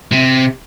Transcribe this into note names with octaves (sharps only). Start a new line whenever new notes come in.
C3